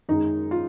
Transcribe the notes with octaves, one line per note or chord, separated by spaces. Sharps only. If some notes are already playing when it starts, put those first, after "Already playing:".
F#2 D#3 G#3 D#4
F4